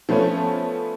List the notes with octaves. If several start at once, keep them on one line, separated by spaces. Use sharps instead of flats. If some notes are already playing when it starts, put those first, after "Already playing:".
F3 A3 B3 C#4